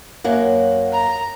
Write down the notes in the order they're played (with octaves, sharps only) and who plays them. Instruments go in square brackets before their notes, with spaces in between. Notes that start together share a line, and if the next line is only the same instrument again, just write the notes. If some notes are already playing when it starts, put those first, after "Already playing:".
[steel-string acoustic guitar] F#2 F#3 A#3
[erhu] A#5